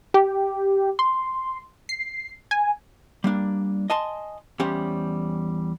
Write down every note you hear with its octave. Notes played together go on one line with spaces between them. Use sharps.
G4
C6
C7
G#5
G3 A#3 D4
D#5 G#5 A5 C6
E2 G3 C#4 G4 C5